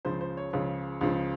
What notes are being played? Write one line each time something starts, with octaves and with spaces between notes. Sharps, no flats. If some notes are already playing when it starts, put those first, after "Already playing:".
C#2 C#3 F3 C5
C5
C#5
C#2 C#3 F3
C#2 C#3 F3